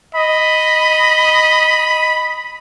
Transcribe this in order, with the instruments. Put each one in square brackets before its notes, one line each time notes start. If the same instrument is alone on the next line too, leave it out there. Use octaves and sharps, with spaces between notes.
[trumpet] D#5 [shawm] B5